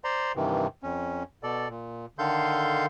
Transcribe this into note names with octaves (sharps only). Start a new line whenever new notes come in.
C5 D5 A#5 C6
G2 C3 D#3 E3
F2 C#4
B2 A4 D5
A#2
D3 D#3 A4 F5 C6 G6